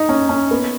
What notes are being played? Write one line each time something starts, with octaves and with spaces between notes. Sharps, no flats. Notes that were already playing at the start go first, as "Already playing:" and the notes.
Already playing: D#4
C#4
C#4
B3